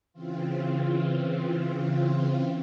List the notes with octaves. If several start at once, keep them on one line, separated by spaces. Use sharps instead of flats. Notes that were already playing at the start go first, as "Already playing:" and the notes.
C#3 E3 C4 F4